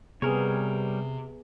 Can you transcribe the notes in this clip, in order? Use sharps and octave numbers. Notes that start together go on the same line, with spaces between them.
C3 G3 B3 G#4 A#4 C#5